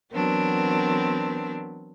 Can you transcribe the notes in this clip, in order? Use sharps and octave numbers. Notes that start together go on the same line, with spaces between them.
E3 F#3 B3 C4 D4 A#4